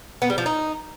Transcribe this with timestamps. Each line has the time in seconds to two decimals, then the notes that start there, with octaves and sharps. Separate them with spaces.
0.22 B3
0.30 G3
0.38 F3
0.46 D#4